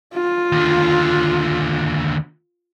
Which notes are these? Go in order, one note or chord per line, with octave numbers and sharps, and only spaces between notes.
F4
D#2 D3